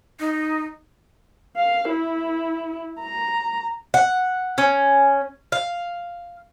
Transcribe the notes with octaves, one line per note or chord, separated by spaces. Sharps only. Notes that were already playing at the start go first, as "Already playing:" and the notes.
D#4
F5
E4
A#5
F#5
C#4
F5